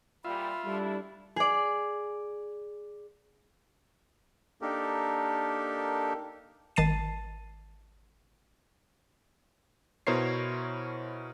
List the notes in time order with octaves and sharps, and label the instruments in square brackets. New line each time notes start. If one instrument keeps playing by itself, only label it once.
[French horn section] A#2 G3 [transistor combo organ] F4 E5 [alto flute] B5
[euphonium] G3 [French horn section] A3 D4 E4
[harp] G#4 D5
[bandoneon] A#3 D4 D#4 G4 A4 A#4
[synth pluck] G#1 D#3 A5 A6 C7 D#7
[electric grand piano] B2 E4 A#4 C5 C#5 C7